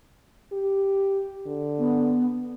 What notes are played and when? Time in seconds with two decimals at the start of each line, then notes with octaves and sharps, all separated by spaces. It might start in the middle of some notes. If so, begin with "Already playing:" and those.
0.53 G4
1.46 D3
1.79 B3